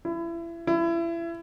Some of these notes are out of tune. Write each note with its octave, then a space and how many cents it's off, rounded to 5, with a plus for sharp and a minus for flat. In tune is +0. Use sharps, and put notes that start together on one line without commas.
E4 +30
E4 +30